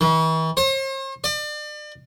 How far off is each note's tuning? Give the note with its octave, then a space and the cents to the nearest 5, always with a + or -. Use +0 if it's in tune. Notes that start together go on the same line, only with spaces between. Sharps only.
E3 -40
C5 +45
D5 +35